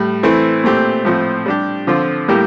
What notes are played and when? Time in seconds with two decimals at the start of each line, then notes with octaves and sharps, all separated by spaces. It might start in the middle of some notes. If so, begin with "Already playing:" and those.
Already playing: A2 G3
0.23 E3 A3 C4 E4
0.64 A#2 A3 C4 G4
1.05 A2 F3 C4
1.46 G3 D4 G4
1.87 D3 F3 C4 F4
2.28 A2 G3 A#3 E4 G4